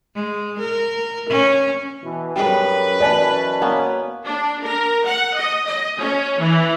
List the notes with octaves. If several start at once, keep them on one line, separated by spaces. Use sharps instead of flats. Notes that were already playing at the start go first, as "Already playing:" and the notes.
G#3
A#4
C#4
B2 E3
F#2 G3 G#3 B4
F#2 B2 E3 D5 G#5 A5
A#3 B3 C#4
D4
A#4
F#5
D#5
D#5
C#4
E3